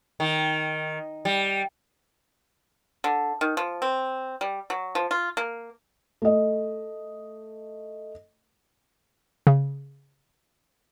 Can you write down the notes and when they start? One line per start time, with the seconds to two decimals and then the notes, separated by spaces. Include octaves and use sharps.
0.20 D#3
1.25 G3
3.04 D3
3.41 D#3
3.57 F3
3.82 C4
4.41 G3
4.70 F#3
4.95 F3
5.11 F4
5.37 A#3
6.22 A3 D#5
9.47 C#3